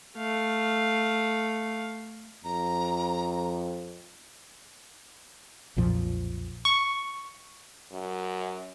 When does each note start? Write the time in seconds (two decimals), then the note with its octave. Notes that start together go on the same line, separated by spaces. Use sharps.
0.16 A3 F5
2.44 F2 A#5
5.76 B1 F2 A#2 F3
6.65 C#6
7.91 F#2